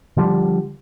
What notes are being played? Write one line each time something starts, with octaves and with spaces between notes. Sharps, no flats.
D3 F3 G3